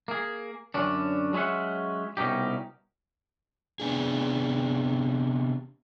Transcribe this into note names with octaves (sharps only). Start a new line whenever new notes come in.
A#3 G#4
F#2 D3 C#4 D4
F#3 G#3 C#4 E5 F#5
C2 B2 C#4 D#4 G4
C3 B3 D4 G#4